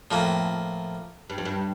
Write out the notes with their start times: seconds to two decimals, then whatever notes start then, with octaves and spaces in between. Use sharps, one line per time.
0.11 F2 A2 F3 A#3
1.30 G2
1.38 F2
1.45 G2